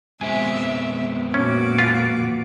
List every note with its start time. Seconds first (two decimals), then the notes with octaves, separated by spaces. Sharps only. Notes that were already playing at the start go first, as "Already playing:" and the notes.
0.21 F2 G#3 B3 C4 E5 G#5
1.34 A#2 C#4 F#4 D6
1.78 F4 B4